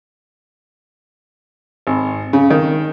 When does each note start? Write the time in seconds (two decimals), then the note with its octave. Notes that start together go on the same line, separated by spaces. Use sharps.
1.87 G#1
2.33 C#3
2.50 D#3